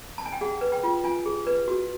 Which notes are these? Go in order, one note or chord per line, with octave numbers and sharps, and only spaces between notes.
A5
G#5
G5
G#4 F#5
B4
G5
F4
F4 G#5
G#4
B4
F#4